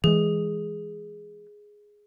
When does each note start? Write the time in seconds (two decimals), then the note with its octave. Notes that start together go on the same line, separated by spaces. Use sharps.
0.04 E3 G#3 G#4